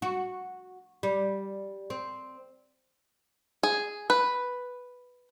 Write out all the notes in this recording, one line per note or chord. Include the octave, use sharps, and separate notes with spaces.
F#4
G3
C4
G#4
B4